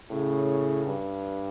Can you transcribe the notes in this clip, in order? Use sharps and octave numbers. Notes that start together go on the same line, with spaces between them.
A2 C#3
G2